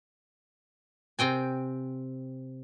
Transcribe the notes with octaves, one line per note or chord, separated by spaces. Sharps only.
C3 C4 G5 G#5